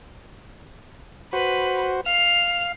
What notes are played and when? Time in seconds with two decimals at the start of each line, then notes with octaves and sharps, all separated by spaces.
1.33 F#4 B4 C5
2.06 F5 C7 F7